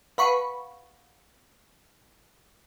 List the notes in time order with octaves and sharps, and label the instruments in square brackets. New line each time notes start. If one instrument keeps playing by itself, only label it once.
[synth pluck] B4 B5 C#6 [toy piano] F5 F#5 A5